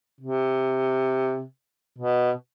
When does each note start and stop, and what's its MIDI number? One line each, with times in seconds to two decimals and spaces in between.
0.21 1.43 48
1.98 2.31 47